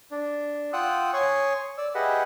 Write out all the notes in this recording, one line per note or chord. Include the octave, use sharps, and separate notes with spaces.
D4
F4 F#5 G5 D#6 E6 F#6
C#5 G#5 C6 C#6 D#6
D5 E6
G4 G#4 B4 D#5 E5 F#5